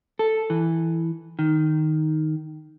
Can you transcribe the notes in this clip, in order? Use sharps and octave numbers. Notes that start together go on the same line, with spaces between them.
A4
E3
D#3